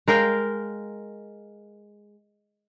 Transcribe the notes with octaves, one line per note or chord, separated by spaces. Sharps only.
G#3 A#4 F5 G5